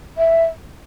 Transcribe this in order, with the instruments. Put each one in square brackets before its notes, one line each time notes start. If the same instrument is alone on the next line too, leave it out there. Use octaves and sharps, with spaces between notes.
[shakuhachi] E5